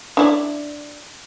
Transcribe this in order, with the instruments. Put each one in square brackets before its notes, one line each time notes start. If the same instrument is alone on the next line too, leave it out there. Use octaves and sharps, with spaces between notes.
[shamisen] D4 E4 D5